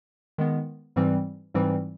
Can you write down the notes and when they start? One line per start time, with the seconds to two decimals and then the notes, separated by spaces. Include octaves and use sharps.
0.38 D#3 G#3 B3
0.96 G#2 E3 G3 C4
1.54 G#2 E3 G3 C4